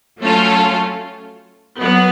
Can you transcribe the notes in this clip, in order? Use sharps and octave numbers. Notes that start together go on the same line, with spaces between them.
F#3 A3 C#4 F4 A4
F#3 B3